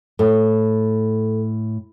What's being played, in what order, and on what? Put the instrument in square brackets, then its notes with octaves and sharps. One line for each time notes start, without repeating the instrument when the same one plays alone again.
[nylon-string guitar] A2 [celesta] A4